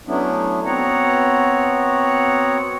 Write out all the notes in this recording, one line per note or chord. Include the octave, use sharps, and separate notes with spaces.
F#3 A3 B3 C#4 D4 E4
B3 C4 F#4 C#5 F#5 A#5